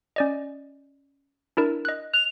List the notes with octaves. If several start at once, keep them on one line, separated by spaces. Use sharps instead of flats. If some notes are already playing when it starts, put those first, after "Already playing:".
C#4 D5 D#5
D4 E4 A#4
D#5 F#6
F#6 F7